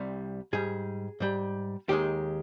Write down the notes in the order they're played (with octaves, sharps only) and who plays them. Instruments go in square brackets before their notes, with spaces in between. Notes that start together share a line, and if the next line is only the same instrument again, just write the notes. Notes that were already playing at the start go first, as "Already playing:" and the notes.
Already playing: [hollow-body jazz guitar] C2 C3 G3
G#2 G3 G#4
G#2 G3
D#2 D#3 G#3 G4